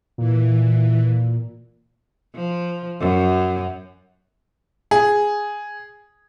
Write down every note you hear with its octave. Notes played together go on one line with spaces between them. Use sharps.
A#2 E3
F3
F#2
G#4